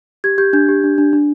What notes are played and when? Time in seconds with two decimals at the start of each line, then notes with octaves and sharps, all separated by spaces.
0.24 G4 G#6
0.38 G4 G6
0.53 D4 G6
0.69 G4
0.84 D4
0.98 D4
1.13 D4